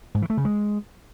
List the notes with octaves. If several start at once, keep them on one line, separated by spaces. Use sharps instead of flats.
G#2
E3
A3
C#3
G#3